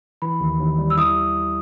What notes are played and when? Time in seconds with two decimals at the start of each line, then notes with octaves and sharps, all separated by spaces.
0.22 E3 B5
0.40 D#2
0.60 D#2
0.79 G3
0.90 E6
0.97 E4 D#6